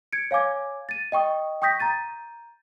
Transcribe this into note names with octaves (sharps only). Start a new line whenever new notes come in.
G#6 C#7 D7
C#5 F5 G#5 D6 G#6
A6 D#7
D#5 G5 C#6 D#6
G5 C#6 D#6 G6 A#6 B6
A#5 G6 A6 D#7